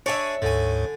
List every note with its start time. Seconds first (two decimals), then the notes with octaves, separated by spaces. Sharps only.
0.06 D4 G#4 C#5 E5 G#5
0.42 D2 G#2 D3 G#5